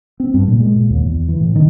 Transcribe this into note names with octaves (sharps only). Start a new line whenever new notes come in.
C4
G2
A#2
G#3
A#2
D#2
E2
E3
A2
D#3